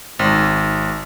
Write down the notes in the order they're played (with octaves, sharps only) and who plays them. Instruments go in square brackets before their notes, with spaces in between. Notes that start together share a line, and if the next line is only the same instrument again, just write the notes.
[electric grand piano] G#1